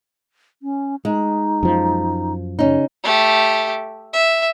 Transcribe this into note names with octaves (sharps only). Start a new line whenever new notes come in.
C#4
G#3 D#4
F#2 F3
C#3 C#4 D#4
A3 G4
E5